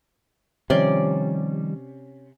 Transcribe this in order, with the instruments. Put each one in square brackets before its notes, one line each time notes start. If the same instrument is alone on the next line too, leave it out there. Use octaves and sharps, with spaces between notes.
[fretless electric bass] C3 [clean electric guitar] D#3 F3 G3 [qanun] C#4 D5 C6